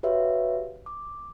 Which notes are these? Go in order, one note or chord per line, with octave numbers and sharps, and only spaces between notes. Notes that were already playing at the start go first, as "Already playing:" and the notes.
F#4 G4 B4 C#5 E5 F5
D6